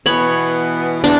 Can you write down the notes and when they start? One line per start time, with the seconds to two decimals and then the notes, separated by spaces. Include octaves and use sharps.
0.06 B2 E3 B3 C#5 B5
1.04 E2 D4